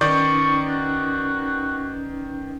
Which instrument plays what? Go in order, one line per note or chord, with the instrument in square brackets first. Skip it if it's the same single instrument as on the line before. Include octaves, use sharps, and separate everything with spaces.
[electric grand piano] D#3 D5 G6 [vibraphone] C#4 D#4 B4 [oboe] C#6
[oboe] F#4